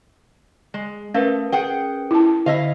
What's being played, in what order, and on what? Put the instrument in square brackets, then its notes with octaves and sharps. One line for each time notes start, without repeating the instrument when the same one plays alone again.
[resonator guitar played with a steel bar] G#3
[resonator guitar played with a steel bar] A3 [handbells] C#4 A#4 B4 [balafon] F5
[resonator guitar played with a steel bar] G#4 F#5 G5
[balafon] E4 A5
[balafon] D3 [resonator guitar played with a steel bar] E4 D#5 F5